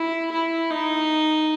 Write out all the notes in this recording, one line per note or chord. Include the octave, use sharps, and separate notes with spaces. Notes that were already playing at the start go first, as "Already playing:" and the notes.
Already playing: E4
E4
D#4